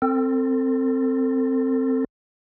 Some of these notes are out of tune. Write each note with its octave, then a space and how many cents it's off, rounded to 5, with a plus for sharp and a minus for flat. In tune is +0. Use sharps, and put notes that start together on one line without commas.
C4 +0 A4 +35